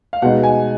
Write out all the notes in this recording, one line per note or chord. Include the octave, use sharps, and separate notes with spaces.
F5
B2 G#3 D#4 F#5
G#5